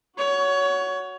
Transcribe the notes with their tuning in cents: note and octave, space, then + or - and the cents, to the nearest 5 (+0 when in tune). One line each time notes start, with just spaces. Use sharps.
F#4 +0 C#5 +20